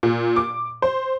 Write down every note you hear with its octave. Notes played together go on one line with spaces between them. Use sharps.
A#2
D6
C5